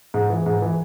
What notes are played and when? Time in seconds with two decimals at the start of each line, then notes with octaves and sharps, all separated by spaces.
0.14 G#2
0.30 E3
0.46 G#2
0.62 E3